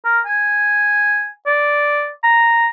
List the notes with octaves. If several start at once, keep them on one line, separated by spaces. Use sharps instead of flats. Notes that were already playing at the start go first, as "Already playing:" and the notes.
A#4
G#5
D5
A#5